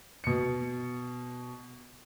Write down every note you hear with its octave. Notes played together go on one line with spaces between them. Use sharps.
B2 C#7